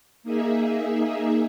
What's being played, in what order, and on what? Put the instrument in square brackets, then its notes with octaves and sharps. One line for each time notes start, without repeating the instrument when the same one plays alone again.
[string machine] A#3 D#4 G#4 E5